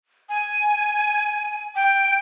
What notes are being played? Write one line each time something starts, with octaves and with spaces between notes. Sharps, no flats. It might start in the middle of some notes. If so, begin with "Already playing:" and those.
G#5
G5